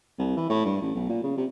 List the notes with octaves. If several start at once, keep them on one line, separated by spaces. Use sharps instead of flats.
C2
E3
A2
G2
A1
B1
A#2
C#3
C3